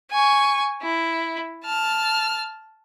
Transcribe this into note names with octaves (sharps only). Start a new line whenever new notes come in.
G#5 C#6
E4
A5 F6